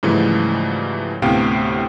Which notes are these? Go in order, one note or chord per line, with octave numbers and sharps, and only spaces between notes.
G#2 C#3 E3 F3 G3 A3
D2 A2 C3 B3 F5 G5